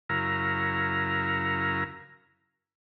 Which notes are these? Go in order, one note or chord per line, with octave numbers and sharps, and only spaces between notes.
F#2 C#3 E4 A#4 F5 A#5